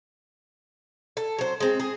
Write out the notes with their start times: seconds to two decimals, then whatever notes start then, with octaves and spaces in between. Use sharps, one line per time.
1.17 A4
1.38 F#3 C5
1.60 G#3 C4
1.79 G#4